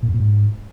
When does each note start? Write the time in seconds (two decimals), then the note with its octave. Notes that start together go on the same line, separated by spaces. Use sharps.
0.03 A#2
0.08 F2
0.14 A#2
0.20 G#2